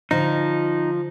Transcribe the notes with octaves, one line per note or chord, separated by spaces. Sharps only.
D3 F3 D#4